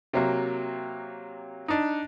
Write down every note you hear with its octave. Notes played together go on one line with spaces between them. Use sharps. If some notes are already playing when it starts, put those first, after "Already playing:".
C3 F#3 A#3
D4 D#4